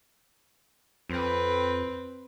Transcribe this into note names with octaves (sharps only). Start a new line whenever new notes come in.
F2 C4 B4